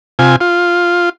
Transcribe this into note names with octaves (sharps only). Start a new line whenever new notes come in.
C3 F4 G#5
F4